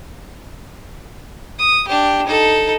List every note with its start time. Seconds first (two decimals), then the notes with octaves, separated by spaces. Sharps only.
1.59 D#6
1.88 D4 G4
2.27 D#4 A4